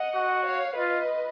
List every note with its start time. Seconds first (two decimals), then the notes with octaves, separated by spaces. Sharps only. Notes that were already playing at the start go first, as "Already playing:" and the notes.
Already playing: D#5 F#5
0.15 F#4
0.47 C#5 F5
0.78 F4 B4 D#5